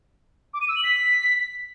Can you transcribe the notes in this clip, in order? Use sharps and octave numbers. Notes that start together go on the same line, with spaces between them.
D6
D#7
E6
F#7
B6